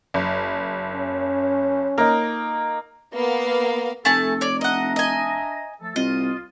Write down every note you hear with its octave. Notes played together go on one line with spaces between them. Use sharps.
F#1
C#4
A#3 D#4 A#4
A#3 B3 F5
F1 A3 A4 G#5 A5
C#5 D5
D4 D#5 E5 F#5 A#5
D#5 G#5
F3 A3 A4
C2 F4 D#5